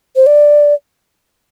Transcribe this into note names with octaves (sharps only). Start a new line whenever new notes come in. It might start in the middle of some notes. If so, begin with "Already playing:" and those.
C5
D5